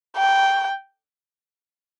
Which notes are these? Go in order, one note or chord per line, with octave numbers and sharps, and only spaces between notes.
G5